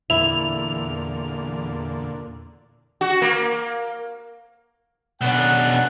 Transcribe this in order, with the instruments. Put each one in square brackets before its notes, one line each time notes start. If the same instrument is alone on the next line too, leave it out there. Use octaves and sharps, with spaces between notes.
[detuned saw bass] E2 [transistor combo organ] A#2 D3 [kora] E4 [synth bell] F7
[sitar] F#4
A#3
[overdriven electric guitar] B2 D4 [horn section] C#4 F#5